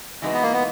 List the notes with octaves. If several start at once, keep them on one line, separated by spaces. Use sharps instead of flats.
E3 G#3 D#4 F#4 B4
B3
A#3
B3